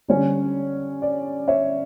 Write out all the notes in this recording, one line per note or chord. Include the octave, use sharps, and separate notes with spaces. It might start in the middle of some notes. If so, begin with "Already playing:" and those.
D3 G3 C#4 C#5
D5
C#5 E5